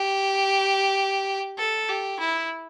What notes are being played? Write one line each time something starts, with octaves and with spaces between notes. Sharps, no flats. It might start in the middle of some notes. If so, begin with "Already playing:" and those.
Already playing: G4
A4
G4
E4